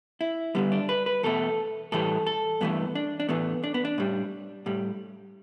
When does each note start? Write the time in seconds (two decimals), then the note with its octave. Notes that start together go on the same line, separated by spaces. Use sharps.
0.21 E4
0.55 G2 D3 G3 B3
0.72 D4
0.89 B4
1.06 B4
1.23 E2 B2 A3 A4
1.92 A2 E3 G3 A4
2.27 A4
2.61 G2 E3 A3 B3
2.95 D4
3.20 D4
3.29 A2 E3 A3 B3
3.64 D4
3.74 B3
3.85 D4
3.98 A2 G3
4.66 A2 G3